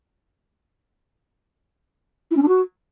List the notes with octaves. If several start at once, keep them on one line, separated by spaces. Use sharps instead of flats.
E4
C#4
D4
F#4